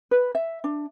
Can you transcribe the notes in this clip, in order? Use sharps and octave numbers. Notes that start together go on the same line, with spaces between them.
B4
E5
D4